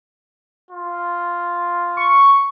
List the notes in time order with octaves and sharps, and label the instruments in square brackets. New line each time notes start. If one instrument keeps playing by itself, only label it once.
[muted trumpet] F4
[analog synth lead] C#6